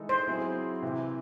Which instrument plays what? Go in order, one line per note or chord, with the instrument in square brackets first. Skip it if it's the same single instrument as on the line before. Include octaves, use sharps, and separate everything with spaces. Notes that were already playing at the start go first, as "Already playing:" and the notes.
Already playing: [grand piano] E3 G#3 D#4 A4
[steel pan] C5
[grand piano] F#3 C4 E4 G#4
C3 E3 C4